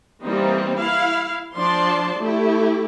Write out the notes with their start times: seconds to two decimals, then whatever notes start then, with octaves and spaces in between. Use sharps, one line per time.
0.22 E3 G3 A#3 C4 D#4
0.78 E4 F5
1.56 F3 D4 D5 A5 C6
2.20 A3 E4 G4